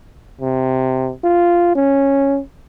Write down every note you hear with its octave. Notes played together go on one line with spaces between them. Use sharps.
C3
F4
C#4